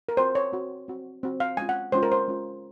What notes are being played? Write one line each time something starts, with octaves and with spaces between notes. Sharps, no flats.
A#4
C4 F#4 C5
C#5
C4 F#4
C4 F#4
C4 F#4
F5
G#3 C#4 F4 G#5
F#5
G#3 C#4 F4 C5
A#4
C5
G#3 C#4 F4